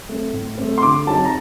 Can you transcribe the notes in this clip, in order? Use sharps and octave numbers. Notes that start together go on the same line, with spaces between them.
A3 C4
A2
A3 C4
C6
D3 D6
F#3 C4 D#4 A5
A#5